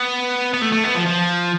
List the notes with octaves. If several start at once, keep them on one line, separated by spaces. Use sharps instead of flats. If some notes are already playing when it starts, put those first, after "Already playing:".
Already playing: B3
B3
A3
A3
B3
F3
F3